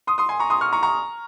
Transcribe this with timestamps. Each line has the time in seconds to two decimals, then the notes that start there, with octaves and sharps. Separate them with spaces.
0.07 C6 D#6
0.18 C6 D#6
0.29 G#5 C6
0.39 A#5 C#6
0.50 C6 D#6
0.61 C#6 F6
0.73 A#5 C#6
0.83 A#5 C#6